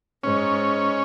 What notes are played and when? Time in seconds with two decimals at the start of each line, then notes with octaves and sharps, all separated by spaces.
0.24 G#2 C#4